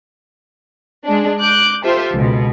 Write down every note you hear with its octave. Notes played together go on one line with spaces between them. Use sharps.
G#3 D4
D6 F#6 G6
F4 G4 A4 C5 E5
C#2 B2